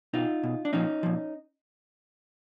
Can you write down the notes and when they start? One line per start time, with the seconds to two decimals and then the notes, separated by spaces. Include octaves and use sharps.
0.13 B2 D#4 F4
0.43 B2
0.65 D4
0.73 A#2 F3 C#4 D#4
1.03 A#2 F3